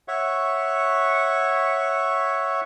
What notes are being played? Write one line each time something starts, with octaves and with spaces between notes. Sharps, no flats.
C#5 E5 F#5 C#6